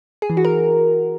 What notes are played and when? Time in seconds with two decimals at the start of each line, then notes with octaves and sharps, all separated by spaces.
0.22 G#4
0.30 E3
0.37 F#4
0.45 A#4